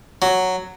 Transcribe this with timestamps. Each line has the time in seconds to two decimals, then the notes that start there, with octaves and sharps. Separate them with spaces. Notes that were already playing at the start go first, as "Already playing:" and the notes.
0.22 F#3